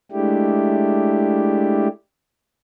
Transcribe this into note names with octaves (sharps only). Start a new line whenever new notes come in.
G#3 A3 D4 E4 G4